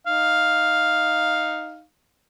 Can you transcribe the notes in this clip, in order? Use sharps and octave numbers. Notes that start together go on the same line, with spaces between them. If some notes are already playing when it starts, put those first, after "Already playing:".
D#4 F5